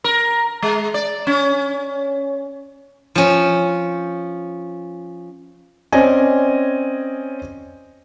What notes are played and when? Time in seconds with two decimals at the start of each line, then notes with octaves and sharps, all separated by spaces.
0.04 A#4
0.62 G#3
0.94 D5
1.27 C#4
3.15 F3 C#4
5.92 C4 C#4 D5 D#5 G#5